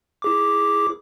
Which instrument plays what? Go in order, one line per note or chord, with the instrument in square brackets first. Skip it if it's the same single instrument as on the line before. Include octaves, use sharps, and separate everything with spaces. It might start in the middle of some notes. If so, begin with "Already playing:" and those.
[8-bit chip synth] E4 G#4 D6